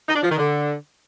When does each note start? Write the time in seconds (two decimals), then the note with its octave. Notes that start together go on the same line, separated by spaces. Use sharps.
0.08 D#4
0.16 D4
0.23 F3
0.30 D#3
0.38 D3